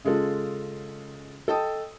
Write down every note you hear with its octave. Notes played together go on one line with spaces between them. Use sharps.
C#3 G#3 F4 A4
A4 D#5 G5 A5 D#6